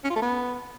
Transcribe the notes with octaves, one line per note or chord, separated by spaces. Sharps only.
C#4
F4
A3
B3